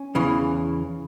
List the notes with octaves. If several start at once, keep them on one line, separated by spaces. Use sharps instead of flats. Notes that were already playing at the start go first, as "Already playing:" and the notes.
Already playing: C#4
E2 C#3 E3